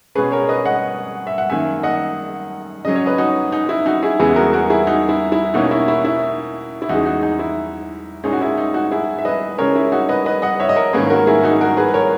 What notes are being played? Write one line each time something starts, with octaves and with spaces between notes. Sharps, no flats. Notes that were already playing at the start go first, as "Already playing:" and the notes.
B2 G#3 C#4 G#4 B4
A#4 C#5
B4 D#5
D#5 F#5
E5
F#5
F#2 D#3 A#3 E5 G#5
D#5 F#5
C#3 F#3 C#4 D#5
C#5
B4 D#5
D#4 F#4
D#4
E4
D#4 F#4
E4 G#4
E2 C#3 G#3 B3 E4 G#4
F#4 A#4
F#4 A#4
E4 G#4
D#4 F#4
E4
E4
B2 A#3 C#4 D#4 F#4
E4
E4
E4
E4
E2 C#3 G#3 D#4 F#4
D#4 F#4
D#4
E4
A#2 G#3 C#4 D#4
F#4
E4
D#4
D#4 F#4
E4 G#4
E5
B4 D#5
C#3 G#3 C#4 A#4 C#5
E4
D#4 F#4
B4 D#5
B4 D#5
D#5 F#5
C#5 E5
D#5
A#4 C#5
G#2 D#3 A#3 C#4 G#4 B4
F#4 A#4
E4 G#4
D#4 F#4
F#4 A#4
G#4 B4
B4
A#4 C#5